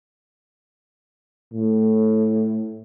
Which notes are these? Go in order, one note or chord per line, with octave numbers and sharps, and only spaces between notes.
A2